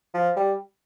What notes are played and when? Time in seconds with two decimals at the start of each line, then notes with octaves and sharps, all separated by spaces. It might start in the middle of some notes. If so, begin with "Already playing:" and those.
0.14 F3
0.36 G3